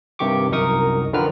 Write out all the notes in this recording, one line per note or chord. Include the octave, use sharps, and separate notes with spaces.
G2 C3 D#3 G4 C#6 D6
C2 F#2 D#4 A#4 C#6 D#6
D3 D#3 F3 A#4 B4 F6